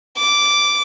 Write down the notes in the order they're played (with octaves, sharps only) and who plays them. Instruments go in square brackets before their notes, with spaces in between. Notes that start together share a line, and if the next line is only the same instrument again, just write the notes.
[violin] D6